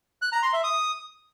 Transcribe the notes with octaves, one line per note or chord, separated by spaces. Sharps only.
F#6
A#5
C6
E5
D#6